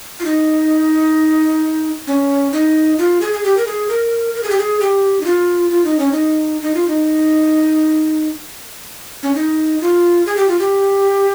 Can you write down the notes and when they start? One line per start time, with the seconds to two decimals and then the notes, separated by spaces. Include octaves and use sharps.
0.20 F4
0.25 D#4
2.07 C#4
2.52 D#4
2.98 F4
3.21 G#4
3.33 G#4
3.44 G4
3.57 A#4
3.67 G#4
3.89 A#4
4.35 A#4
4.43 G#4
4.50 G4
4.58 G#4
4.80 G4
5.21 D#4
5.25 F4
5.70 F4
5.84 D#4
5.99 C#4
6.12 D#4
6.62 D#4
6.75 F4
6.88 D#4
9.23 C#4
9.35 D#4
9.81 F4
10.26 G#4
10.37 G4
10.48 F4
10.59 G4